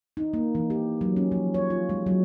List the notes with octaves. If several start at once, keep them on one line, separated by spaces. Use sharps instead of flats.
D#4
A#3
E3
G4
F#3
C#4
F3
C#5
F4
G#3
F#3